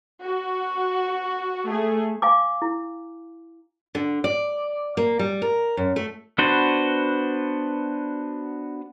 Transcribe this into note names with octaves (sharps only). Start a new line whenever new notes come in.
F#4
A3 G#4
F5 G#5 D6
E4
D3
D5
A#3
G3
A#4
F#2
A3
B3 D4 F#4 B4 C5